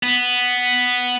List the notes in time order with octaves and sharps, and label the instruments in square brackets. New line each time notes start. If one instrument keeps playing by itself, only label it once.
[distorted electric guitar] B3